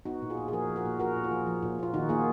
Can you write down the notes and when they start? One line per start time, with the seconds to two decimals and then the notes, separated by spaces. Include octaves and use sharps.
0.06 B3 D#4 F#4
0.22 A#2
0.30 F4 G#4
0.37 A#2
0.48 G#4
0.53 F3 F#4 A#4
0.69 F3
0.76 F#4 A#4
0.85 A#2
0.99 A#2 F#4 A#4
1.16 A#2
1.24 F4 G#4
1.31 F3
1.47 F3
1.63 A#2
1.79 A#3 F4
1.94 D#3 D#4 F#4
2.09 A#3 F4 G#4